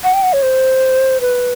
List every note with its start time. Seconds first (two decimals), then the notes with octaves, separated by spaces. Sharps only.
0.04 F#5
0.14 G5
0.23 F#5
0.33 C#5
0.42 C5
1.21 B4